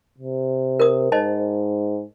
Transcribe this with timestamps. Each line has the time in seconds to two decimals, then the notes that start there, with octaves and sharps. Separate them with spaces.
0.18 C3
0.80 A#4 D#6
1.12 G#2 C5 D#5 A5